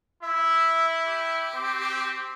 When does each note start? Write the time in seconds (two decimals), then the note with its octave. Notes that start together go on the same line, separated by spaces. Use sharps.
0.23 E4 E5
1.07 G4
1.54 C4